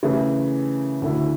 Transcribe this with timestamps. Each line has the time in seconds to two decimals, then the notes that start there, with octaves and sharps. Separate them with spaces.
0.03 C#3 E3 A3
1.02 D2 D3 A3 E4